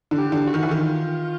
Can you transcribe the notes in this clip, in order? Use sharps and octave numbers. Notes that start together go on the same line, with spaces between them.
D3
G4
D3
F#4
D#3
E3
D#3 F4